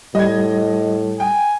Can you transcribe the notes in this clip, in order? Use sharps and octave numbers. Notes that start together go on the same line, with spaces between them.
A2 G3 D#5 G#6
G5 G#5